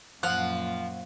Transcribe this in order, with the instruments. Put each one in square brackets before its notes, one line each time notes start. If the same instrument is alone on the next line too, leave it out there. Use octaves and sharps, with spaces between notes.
[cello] F#2 A#2 [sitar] F3 [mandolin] F#5 F6